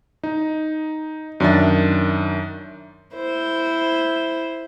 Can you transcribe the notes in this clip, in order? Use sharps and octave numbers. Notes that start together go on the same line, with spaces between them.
D#4
F#2 D#3 D4 E5 A6
E4 C5